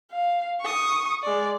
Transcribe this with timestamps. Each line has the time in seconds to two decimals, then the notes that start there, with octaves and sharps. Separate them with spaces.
0.12 F5
0.61 C#6 D#6
1.23 G#3 D5